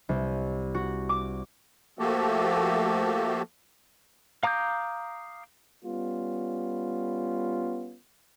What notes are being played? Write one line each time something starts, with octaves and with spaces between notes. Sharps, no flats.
C2
F#4
D6
F3 A3 A#3 F#4 G4 A4
F5 A#5 D6 D#6 G6
G3 B3 C#4 F4